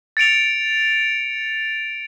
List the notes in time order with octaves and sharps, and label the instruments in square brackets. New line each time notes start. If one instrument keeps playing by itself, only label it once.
[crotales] A6 C#7 D7 F7